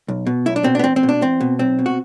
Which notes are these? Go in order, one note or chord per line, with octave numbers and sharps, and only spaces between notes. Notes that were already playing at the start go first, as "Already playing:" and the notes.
B1
B2
B1 E4
D4
B2 C4
B3 D4
E2 C4
C4
B2
D4
E2 C4
B2
B1 C4
B2
F#4